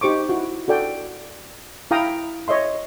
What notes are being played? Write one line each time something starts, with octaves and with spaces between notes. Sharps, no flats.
D#4 G4 C5 C#6 D6
E4 F#4
F#4 A4 D5 G5
E4 F5 G5 A#5 D#6
C#5 D#5 E5 C6